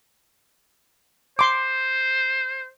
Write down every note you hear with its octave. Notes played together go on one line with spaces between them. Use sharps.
C5 C6 D6